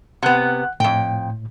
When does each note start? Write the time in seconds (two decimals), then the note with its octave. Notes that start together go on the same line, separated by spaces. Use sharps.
0.23 C3 B3 F#5 F#6
0.80 F2 A2 G5